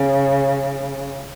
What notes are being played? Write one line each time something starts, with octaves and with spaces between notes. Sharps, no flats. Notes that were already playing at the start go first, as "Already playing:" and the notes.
Already playing: C#3